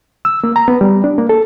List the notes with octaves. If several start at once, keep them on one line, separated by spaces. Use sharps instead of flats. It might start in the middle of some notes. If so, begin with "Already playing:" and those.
E6
A#3
A#5
B3
G3
D4
A#3
A4